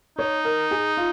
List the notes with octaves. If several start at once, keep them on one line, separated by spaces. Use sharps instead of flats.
D#4 C#5
A#4
G#4
F4